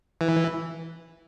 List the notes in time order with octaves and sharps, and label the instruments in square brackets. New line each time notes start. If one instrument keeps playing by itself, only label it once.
[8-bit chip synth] E3